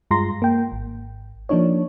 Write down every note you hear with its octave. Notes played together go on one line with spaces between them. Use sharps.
G2 G#3 F4 A#5 C6 A#6
A#3 G5
G#1
F3 A#3 D4 D#4 C#5